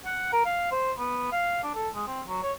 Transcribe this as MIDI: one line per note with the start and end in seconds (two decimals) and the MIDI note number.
0.05 0.32 78
0.32 0.45 70
0.45 0.68 77
0.71 0.92 72
0.98 1.31 59
1.32 1.62 77
1.63 1.75 62
1.75 1.89 69
1.95 2.05 56
2.07 2.22 60
2.27 2.41 54
2.43 2.52 73